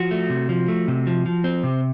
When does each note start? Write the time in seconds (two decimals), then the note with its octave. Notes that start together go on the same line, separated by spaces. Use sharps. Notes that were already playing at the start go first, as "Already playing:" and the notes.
Already playing: F3 F#4
0.11 A3
0.30 C3
0.49 F3
0.68 A3
0.88 C3
1.07 F3
1.26 F3
1.44 C4
1.63 C3